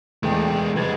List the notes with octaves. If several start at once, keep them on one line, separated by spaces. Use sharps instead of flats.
E2 G#3 A3 D4 G5
F3 G#3 B4 G#6 A6